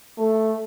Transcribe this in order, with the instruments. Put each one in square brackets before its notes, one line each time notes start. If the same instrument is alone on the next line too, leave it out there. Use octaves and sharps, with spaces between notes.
[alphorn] A3